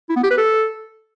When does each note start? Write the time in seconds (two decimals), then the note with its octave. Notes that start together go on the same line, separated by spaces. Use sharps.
0.09 E4
0.16 B3
0.23 G4
0.30 B4
0.38 A4